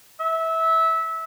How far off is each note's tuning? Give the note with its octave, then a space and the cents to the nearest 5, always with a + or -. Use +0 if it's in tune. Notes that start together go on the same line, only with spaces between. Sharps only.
E5 -20